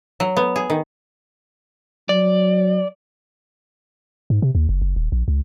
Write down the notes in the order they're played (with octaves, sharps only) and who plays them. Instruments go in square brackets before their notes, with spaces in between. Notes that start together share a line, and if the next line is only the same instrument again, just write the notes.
[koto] F#3
B3
G#4
D#3
[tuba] F#3 [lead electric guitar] D5
[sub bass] G#2
C3
D#2
F#1
F#1
D#1
A#1
C#2